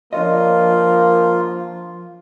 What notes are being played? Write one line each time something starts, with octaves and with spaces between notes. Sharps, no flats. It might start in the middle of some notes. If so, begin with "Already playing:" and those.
F3 A#3 D4 F4 C#5 D#5